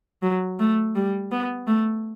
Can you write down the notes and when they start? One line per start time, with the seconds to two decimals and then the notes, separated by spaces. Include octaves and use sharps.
0.22 F#3
0.60 A3
0.95 G3
1.32 B3
1.68 A3